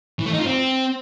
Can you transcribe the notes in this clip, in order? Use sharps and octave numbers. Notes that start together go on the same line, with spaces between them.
E3
A3
D#4
F4
C4